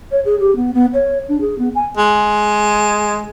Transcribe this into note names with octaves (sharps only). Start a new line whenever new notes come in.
C#5
G#4
G4
B3
B3
C#5
D4
G#4
B3
G#5
G#3